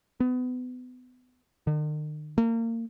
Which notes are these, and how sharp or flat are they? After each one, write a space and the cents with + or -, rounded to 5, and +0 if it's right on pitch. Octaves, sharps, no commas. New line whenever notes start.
B3 +30
D#3 -45
A#3 -30